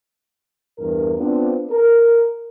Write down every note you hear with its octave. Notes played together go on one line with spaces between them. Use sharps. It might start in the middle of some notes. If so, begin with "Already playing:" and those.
E2 G2 A#4
B3 C4 D4 F4
A#4